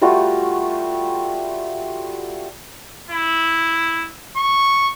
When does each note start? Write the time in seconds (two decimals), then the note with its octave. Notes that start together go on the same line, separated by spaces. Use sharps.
0.02 G3 A3 F4 F#4
3.11 E4
4.37 C#6